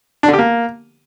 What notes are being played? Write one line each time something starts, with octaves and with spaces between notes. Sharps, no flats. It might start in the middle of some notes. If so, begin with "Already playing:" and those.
D4
D3
G4
A#3